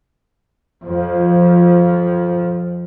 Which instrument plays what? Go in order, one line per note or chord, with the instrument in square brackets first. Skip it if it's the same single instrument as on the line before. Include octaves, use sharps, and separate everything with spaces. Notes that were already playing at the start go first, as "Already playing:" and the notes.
[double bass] F2 F3